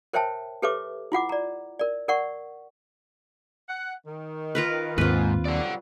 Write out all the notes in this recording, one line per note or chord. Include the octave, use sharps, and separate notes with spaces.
A#4 C5 C#5 E5 G5 A5
G4 A4 B4 C#5 E5 D6
E4 F4 F#5 D6
D5 A#5
A#4 D5
A#4 D5 F#5 C#6
F#5
D#3
F4 A#4 B4
D#2 G#2 A3 C4 F4 B4
C3 F#3 G3 D5 F#5